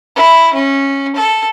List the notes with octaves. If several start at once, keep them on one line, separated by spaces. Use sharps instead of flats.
E4
C#4
A4